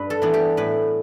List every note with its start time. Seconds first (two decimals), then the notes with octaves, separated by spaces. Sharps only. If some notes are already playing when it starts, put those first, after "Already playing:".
Already playing: G2 B4
0.10 A4
0.22 E3 B3 D4
0.34 G4
0.57 A2 B4